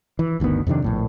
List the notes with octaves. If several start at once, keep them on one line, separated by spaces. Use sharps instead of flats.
E3
G1 D2 D#3 B3
F2 C3 D#3 D4
A#1 A2